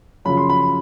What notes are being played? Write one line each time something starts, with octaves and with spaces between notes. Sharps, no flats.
F#2 C#3 F3 B5
C6
B5